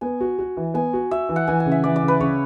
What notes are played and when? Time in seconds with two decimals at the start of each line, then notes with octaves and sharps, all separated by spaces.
0.01 B3 G#5
0.21 F#4
0.39 F#4
0.57 E3
0.74 B3 G#5
0.93 F#4
1.11 F#4 E5
1.29 E3
1.36 F#5
1.47 E3 G#5
1.60 G#5
1.66 C#3
1.72 E5
1.84 E3 D5
1.96 D5
2.03 C#3
2.08 B4
2.20 C#3 C#5